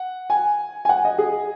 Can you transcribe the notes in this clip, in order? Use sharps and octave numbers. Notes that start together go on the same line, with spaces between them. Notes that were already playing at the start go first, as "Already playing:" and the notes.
Already playing: F#5
G#5
G#5
F#5
D#5
G#4